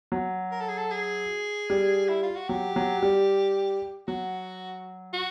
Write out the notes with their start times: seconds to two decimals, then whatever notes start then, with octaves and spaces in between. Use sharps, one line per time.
0.12 F#3
0.52 A#4
0.61 A4
0.69 G#4
0.78 A4
0.91 G#4
1.70 G3
2.09 E4
2.23 F4
2.36 F#4
2.49 F#3 G4
2.76 F#3
3.02 G3
4.08 F#3 F#4
5.13 F#4